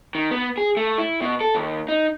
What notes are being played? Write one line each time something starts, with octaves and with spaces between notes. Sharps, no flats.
D#3
B3
G#4
A3
E4
B2
A4
D#2
D#4